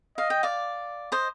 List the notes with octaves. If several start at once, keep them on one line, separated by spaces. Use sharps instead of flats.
D#5 F5
G5
D5 F5
C5 D#5